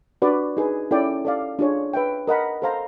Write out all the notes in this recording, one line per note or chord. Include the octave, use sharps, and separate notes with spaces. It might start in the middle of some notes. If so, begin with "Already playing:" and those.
D4 F#4 B4 D5
D#4 G#4 B4
C#4 E4 A4 D5 G5
A4 D5 F5
D4 F4 G#4 C#5
B4 E5 G5
A#4 D#5 F#5 B5
A4 C5 F5 A#5